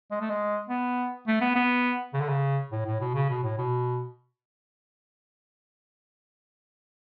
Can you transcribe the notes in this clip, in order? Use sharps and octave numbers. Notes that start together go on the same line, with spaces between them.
G#3
A3
G#3
B3
A3
B3
B3
C#3
D3
C#3
A2
A2
B2
C#3
B2
A2
B2